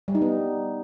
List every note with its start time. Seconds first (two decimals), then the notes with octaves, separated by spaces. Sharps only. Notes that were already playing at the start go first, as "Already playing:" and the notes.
0.08 G3
0.15 D#4
0.22 B3